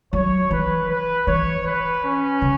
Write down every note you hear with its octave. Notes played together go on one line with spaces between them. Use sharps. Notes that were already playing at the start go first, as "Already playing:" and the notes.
F#3 C#5
E3 B4
B4
E3 C#5
B4
C#4
C#3